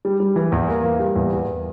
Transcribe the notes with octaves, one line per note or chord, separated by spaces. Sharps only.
G3
G3
E3
E2
A#3
A#3
G3
E2
E2